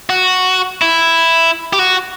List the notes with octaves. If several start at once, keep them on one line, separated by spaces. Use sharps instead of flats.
F#4
E4
G4
F#4